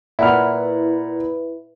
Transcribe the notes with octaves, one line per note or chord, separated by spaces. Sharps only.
A#2 E4 B4 F#5 F6